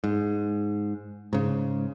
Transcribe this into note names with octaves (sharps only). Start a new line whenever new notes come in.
G#2
G#2 C#3